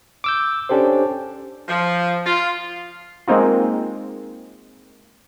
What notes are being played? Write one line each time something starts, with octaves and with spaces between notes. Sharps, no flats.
D6 E6 G6
C#4 D4 G4 A4 C5
F3
F4
G#3 A#3 C4 D#4 F4